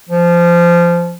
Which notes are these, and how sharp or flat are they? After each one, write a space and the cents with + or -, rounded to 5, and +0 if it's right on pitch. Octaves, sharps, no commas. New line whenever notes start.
F3 -20